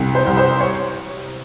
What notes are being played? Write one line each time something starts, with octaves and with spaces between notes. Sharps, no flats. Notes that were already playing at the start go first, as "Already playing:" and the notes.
Already playing: C2
C5
C2
C5
C#5